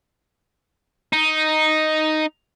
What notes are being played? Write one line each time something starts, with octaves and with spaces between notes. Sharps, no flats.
D#4